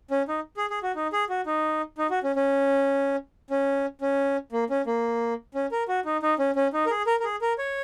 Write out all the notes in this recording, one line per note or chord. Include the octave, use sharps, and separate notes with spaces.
C#4
D#4
G#4
G#4
F#4
D#4
G#4
F#4
D#4
D#4
F#4
C#4
C#4
C#4
C#4
A#3
C#4
A#3
C#4
A#4
F#4
D#4
D#4
C#4
C#4
D#4
A#4
G#4
A#4
A#4
G#4
A#4
C#5